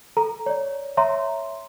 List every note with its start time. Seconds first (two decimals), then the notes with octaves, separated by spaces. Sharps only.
0.17 A4 A#5
0.46 C#5 D5
0.97 C#5 E5 A#5 C6